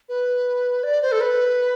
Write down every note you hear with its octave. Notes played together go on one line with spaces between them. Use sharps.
B4
D5
C5
A4
B4